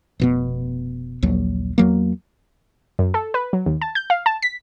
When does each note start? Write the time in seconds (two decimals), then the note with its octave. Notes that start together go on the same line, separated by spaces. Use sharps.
0.20 F1 B2 B3
1.23 A#1 D#2 F#3
1.78 E2 F#3 A#3
2.99 F#2
3.14 A4
3.34 B4
3.53 F#3
3.66 D#2
3.82 A5
3.95 G6
4.10 F5
4.26 A5
4.42 B6